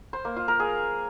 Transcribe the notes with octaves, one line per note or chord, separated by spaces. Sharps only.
C5
A#3
F4
A#4
G#4